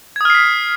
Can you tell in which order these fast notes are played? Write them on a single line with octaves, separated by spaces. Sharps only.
G#6 D#6 F6 C7 B6